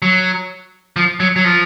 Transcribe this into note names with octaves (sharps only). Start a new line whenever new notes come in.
F#3
F3
F#3
F#3
F3